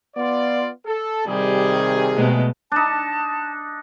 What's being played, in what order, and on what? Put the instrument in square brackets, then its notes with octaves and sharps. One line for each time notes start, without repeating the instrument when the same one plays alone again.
[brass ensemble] B3 F4 D5
A4
[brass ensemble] C3 D#3 G#4 [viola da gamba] G3
[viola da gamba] B2 G#3 A3
[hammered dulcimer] D4 D#4 [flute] A5